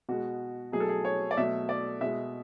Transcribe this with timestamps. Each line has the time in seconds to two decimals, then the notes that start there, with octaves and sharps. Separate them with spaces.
0.09 B2 G#3 F#4
0.72 B2 F#3 A3 G#4
0.80 A4
0.89 G#4
1.05 C#5
1.31 D5
1.37 B2 F#3 A3 E5
1.69 D5
2.01 B2 G#3 E5